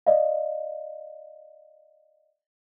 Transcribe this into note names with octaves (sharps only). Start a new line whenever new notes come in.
D5 D#5 F5